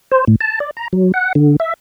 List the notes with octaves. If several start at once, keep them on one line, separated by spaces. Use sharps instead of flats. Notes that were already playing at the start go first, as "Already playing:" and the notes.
C5
A2
A5
D5
A#5
F#3
F#5
D3
E5